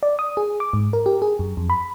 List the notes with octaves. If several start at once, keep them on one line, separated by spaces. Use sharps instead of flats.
D5
D#6
G#4
D6
G#2
A#4
G4
G#4
F#2
F2
B5